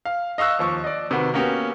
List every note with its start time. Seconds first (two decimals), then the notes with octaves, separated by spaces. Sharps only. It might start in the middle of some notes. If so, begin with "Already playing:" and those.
0.05 F5
0.38 D#5 F5 C#6 E6 F#6
0.59 D#2 F3 C#6
0.84 D5 D#5
1.11 C3 D#3 F#4 B4
1.34 A#3 B3 C#4 F#4 G4